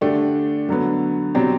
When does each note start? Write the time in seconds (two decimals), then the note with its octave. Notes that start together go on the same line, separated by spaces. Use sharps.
0.01 D3 A3 D4 G4
0.69 D3 F#3 B3
1.35 B2 F#3 C4 G4 D5